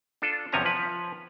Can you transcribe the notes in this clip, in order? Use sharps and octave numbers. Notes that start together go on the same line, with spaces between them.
D4 F4 A4
E2 C3 F3 C#4 G#5 A#5
F3 B4